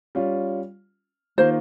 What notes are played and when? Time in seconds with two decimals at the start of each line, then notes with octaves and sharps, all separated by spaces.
0.15 G3 C#4 F4
1.38 D#3 A#3 F4 C5